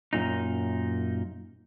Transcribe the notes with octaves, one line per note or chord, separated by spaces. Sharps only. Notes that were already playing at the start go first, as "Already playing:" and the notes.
F#2 A#2 D#4